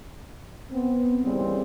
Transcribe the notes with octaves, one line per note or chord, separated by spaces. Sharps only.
B3 C4
D#2 C#3 E3 G3 C4